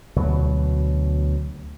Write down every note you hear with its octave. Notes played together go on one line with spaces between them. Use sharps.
D2 B2 F#3